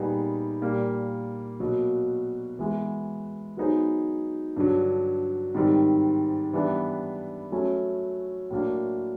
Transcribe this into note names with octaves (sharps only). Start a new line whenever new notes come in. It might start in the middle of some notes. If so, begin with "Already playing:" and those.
Already playing: A#2 G3 B3 D#4 G#4
A#2 G3 A#3
B2 F#3 A#3
E3 G#3 B3
F#3 B3 D#4 G#4 C5
G2 D3 F#3
G#2 D#3 G3 C4
E3 G3 B3 D4
F#3 A3 C#4
A2 F#3 A#3 D4